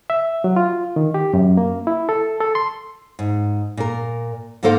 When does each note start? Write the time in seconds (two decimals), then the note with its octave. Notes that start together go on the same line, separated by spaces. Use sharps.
0.10 E5
0.44 F#3
0.56 F4
0.96 D#3
1.14 G4
1.34 F#2
1.57 A#3
1.87 E4
2.09 A4
2.41 A4
2.55 C6
3.19 G#2
3.77 A#2 A#4
4.63 G#2 D3 A#3 A4 C5 F5